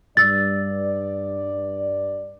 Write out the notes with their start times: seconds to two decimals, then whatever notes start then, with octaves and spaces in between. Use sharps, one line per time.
0.17 G2 D5 E6 A6